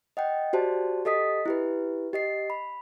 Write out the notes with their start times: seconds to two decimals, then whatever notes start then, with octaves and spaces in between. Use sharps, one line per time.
0.17 D#5 F#5 G5
0.53 F#4 G4 C5 D5 A5
1.05 G4 A4 D#5 D#6 B6
1.46 E4 G4 B4
2.13 G4 D#5 C7
2.50 B5